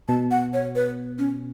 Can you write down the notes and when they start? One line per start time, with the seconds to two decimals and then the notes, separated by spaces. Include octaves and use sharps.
0.08 B2 A5
0.31 F#5
0.53 C#5
0.76 B4
1.18 C#4